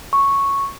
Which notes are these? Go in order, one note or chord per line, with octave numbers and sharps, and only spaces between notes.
C#6